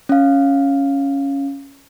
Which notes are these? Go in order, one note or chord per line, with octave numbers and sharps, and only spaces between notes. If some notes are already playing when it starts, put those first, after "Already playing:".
C#4 F5